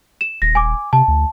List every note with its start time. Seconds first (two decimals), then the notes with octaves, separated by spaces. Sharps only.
0.21 E7
0.42 D#1 A#6
0.55 G#5 D6
0.93 C3 A5
1.08 D2